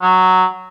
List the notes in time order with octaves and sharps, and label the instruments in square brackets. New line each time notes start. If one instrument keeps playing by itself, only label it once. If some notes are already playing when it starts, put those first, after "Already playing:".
[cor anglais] F#3